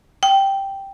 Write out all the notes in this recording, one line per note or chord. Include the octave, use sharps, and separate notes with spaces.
G5